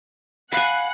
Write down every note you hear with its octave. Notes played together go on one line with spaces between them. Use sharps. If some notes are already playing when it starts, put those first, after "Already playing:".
F5 F#5 G#5 B5 F#6 C#7